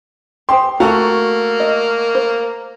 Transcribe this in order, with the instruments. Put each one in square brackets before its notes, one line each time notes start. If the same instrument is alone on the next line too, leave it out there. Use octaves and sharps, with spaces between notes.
[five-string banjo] G4 G#4 C5 [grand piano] C6
[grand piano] A3 F#4 [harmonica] A#3 [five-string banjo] A5 A#5
[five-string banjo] D#5
C5